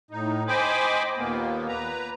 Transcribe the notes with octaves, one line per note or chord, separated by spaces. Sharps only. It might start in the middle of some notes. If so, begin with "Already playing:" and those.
A2 D#4
C5 D#5 G5 G#5 B5 D6
D#2 A#2 A#3 B3
B4 A#5